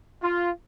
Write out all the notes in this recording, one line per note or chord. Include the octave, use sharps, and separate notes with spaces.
F4